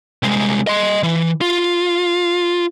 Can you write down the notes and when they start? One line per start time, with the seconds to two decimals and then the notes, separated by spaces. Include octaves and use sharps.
0.23 C2 G#3
0.67 D#5 C6
1.03 E3
1.41 F4